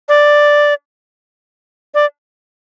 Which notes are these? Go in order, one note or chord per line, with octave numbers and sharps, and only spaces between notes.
D5
D5